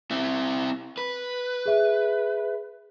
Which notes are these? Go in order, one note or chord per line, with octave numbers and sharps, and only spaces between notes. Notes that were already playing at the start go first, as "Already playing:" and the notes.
C4 E4
B4
G#4 E5